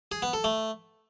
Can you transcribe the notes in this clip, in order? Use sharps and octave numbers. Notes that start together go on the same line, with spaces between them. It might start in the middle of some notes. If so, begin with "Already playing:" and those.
G#4
B3
A4
A3